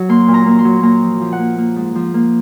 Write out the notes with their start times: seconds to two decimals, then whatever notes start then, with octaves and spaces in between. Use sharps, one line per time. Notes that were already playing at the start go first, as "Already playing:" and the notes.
Already playing: F#3
0.09 A#3 C6
0.28 A#2
0.34 A#5
0.46 A#3
0.59 C6
0.65 F#3
0.83 A#3 A#5
1.02 F3
1.21 F3
1.32 F#5
1.39 A#3
1.58 A#3
1.76 G#2
1.95 F3
2.14 A#3